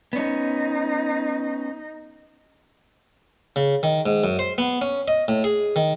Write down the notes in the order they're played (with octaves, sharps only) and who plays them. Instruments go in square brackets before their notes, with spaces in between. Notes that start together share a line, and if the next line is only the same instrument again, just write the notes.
[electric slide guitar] B3 C#4 [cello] D#4
[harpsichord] C#3
D#3
G#2
F#2
C5
B3
C#4
D#5
A2
G#4
D#3